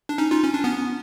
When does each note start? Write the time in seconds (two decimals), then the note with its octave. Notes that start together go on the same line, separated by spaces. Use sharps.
0.09 D4
0.18 C#4 D#4
0.31 D#4 F4
0.44 C#4
0.54 D4
0.64 B3 C#4